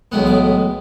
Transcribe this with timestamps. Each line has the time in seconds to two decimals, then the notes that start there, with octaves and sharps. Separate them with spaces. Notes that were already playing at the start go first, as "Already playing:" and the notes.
0.12 B1 A2 E3 G#3 B3 F#5
0.26 F5